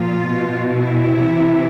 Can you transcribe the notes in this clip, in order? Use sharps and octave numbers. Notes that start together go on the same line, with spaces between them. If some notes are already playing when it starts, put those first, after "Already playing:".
Already playing: A#2 F3 F4
B2
E4
C3 E3